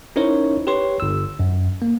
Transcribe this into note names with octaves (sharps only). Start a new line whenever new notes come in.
C#4 D#4 E4 A#4 C5 C#5
G4 B4 C#5 C6
G1 E6
F#2
A#3